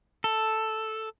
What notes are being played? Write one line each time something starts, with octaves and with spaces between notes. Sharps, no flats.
A4